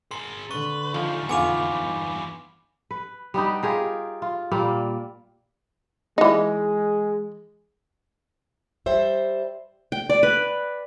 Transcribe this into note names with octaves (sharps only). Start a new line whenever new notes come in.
G#4 A#4 C6
D3 B4 C#6
E2 F3 D#4
F2 D3 B3 F4 G#5 D6 F7
G2
B4
G3 B3 D#4 G4
F4 G4 G#4 A#4
F4
A#2 G3 A#3
E3 G#3 D#4
G3 C5 E5
G5
D5
B4